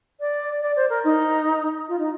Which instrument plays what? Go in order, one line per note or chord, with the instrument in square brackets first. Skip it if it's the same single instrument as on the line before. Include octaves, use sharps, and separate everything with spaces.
[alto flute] D5
D5
C5
A#4
D#4
F4
D#4